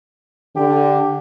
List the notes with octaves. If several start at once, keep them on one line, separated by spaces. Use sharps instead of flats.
D3 G4